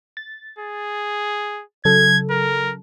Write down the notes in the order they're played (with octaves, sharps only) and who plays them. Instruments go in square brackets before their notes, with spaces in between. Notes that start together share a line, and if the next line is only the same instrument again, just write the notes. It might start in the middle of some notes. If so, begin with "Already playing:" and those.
[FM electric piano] A6
[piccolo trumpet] G#4
[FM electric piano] C#3 F#3 A4 [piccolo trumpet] G#6
[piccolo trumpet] A#4